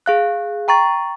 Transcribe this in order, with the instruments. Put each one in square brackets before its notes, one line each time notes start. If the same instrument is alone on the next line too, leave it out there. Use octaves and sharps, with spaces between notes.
[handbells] G#4 F5 F#6
G5 A#5 C#6 A6